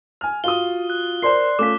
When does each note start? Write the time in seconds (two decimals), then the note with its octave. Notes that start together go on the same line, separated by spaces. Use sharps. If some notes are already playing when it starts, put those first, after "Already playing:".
0.21 G#5 F6
0.44 F4 F#4 D#6 G7
0.90 F#6
1.22 A#4 C5 D5 C6 C7
1.59 A3 C#4 F4 D6 B6